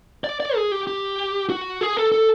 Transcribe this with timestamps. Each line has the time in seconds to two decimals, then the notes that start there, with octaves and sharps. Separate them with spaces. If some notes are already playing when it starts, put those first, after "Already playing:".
0.24 D5
0.40 D5
0.56 G#4
0.72 G4
0.87 G4
1.50 F#4
1.81 G#4
1.97 A4
2.12 A4